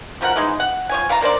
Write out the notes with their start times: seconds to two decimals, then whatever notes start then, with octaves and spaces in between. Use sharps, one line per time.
0.21 B2 F3 A#4 F#5
0.36 E3 G#3 D#4
0.60 F#5
0.89 F3 C#5 G#5
1.09 E3 F5 A5 A#5
1.21 D4 A#4 C5 D5